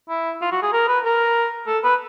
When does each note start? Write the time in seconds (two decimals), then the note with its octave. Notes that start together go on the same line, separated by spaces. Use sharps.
0.09 E4
0.41 F4
0.52 F#4
0.62 G#4
0.73 A#4
0.88 B4
1.05 A#4
1.67 A4
1.84 B4